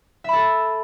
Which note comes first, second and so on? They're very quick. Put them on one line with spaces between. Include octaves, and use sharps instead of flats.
E5 B5 A4